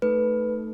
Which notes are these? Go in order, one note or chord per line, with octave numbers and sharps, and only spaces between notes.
A3 D#4 A4 B4